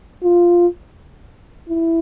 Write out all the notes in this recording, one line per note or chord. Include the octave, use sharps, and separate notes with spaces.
F4
E4